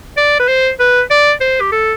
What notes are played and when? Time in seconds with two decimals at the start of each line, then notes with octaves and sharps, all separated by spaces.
0.17 D5
0.39 B4
0.48 C5
0.80 B4
1.11 D5
1.41 C5
1.61 G4
1.72 A4